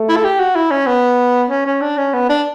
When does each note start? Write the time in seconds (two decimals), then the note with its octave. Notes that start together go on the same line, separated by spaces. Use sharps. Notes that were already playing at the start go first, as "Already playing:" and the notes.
Already playing: A3
0.09 E4
0.16 A4
0.24 G4
0.39 F#4
0.55 E4
0.71 C#4
0.86 B3
1.50 C#4
1.66 C#4
1.81 D4
1.98 C#4
2.14 B3
2.29 D4